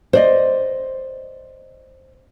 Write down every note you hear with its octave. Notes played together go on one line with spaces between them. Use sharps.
C5 D5 D#5